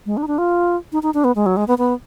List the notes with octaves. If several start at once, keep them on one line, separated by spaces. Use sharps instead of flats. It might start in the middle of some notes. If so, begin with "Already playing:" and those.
G#3
D4
D#4
D4
F4
D#4
D#4
D4
B3
G#3
F#3
G#3
B3
B3